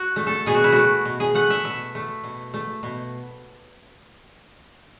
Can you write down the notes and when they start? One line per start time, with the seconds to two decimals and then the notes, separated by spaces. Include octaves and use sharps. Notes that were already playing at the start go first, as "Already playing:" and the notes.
Already playing: F#4
0.16 A3
0.27 A4
0.46 B2 G#4
0.55 F#4
0.64 E4
0.72 A3 F#4
1.05 B2
1.20 G#4
1.35 A3 F#5
1.50 E5
1.64 B2 E5
1.95 A3
2.24 B2
2.54 A3
2.83 B2